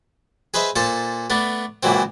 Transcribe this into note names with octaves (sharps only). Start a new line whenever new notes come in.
G#4 B4 C5 D#5 E5
A#2 A4 C5 A5
A3 B3 D4
C#2 A#2 E3 F#3 C4